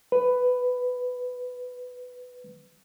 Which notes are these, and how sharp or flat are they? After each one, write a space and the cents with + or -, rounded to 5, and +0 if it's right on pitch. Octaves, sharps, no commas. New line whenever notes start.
B4 +10